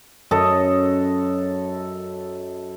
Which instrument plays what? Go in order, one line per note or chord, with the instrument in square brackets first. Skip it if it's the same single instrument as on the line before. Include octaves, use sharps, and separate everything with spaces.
[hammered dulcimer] F#2 A4 D#5